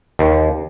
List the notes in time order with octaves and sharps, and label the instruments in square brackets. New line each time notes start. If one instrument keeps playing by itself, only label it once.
[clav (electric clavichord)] D#2